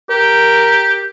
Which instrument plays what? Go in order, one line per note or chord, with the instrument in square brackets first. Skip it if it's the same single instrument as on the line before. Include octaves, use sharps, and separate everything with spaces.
[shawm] G4 [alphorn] A#4